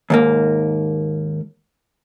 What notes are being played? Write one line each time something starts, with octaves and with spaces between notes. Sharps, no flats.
D#2 G#2 A#3